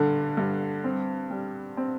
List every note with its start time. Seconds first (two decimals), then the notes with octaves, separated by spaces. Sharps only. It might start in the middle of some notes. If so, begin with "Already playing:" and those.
Already playing: G2 D3
0.37 G2
0.84 C4
1.30 G3
1.77 C4